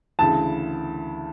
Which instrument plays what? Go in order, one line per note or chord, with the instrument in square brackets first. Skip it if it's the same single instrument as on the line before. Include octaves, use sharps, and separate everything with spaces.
[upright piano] D2 C#3 E3 A5